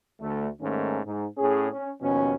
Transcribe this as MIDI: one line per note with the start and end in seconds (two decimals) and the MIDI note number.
0.21 0.48 38
0.21 0.48 50
0.21 0.48 57
0.61 0.99 44
0.61 0.99 51
0.61 0.99 57
0.61 0.99 58
0.61 0.99 61
1.06 1.25 44
1.38 1.67 45
1.38 1.67 61
1.38 1.67 68
1.73 1.91 61
2.02 2.33 39
2.02 2.33 47
2.02 2.33 53
2.02 2.33 61